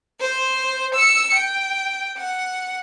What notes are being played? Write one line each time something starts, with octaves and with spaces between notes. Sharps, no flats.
C5
E6 C#7
G5
F#5